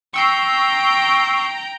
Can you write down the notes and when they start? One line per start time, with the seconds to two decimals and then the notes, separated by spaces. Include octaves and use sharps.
0.14 G5 A#5 C#6 E6 C7